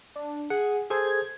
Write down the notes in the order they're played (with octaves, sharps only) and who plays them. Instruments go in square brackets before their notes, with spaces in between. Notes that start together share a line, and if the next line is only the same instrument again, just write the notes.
[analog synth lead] D4
[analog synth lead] G#4 [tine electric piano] F#5
[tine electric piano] G#4 A4 C5 [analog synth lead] G#6